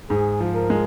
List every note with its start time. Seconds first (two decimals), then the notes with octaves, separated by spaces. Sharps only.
0.10 G#2 G#4
0.40 F3
0.55 A#4
0.70 G#3